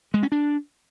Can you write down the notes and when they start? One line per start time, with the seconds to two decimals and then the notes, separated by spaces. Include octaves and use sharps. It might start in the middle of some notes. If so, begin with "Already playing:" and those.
0.14 G#3
0.23 C#4
0.32 D4